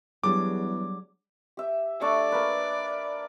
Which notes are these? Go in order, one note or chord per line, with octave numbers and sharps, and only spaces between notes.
E2 F#3 G3 D4 G#4 D6
G4 E5
A3 D4 A4 D5
A#3 B4